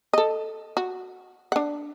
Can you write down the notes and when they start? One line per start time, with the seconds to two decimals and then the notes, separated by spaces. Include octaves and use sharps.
0.13 A4 D#5
0.77 F#4
1.52 D4 F#5